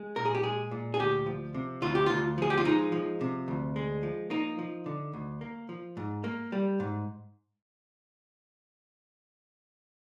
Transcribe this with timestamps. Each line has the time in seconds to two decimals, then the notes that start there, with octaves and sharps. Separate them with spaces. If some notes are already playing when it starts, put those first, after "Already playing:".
Already playing: G#3
0.16 A#2 A#4
0.25 G#4
0.35 G4
0.43 G#3 G#4
0.71 A#2
0.94 G#4
0.99 D2 G4
1.26 F3
1.54 C3
1.82 D2 F4
1.95 G4
2.06 D2 F4
2.38 F3 G#4
2.50 G4
2.58 F4
2.65 G#3 D#4
2.92 F3
3.21 C3
3.48 D2
3.76 G#3
4.03 F3
4.30 A#3 D#4
4.59 F3
4.86 D3
5.13 D2
5.41 A#3
5.69 F3
5.97 G#2
6.24 A#3
6.52 G3
6.80 G#2